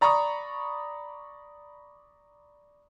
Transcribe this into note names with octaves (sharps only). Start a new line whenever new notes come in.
D5 A#5 B5 C#6 D#6